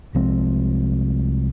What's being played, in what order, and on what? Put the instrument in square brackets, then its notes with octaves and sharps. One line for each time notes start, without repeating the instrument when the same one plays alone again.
[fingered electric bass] C2 F3 G#3 C4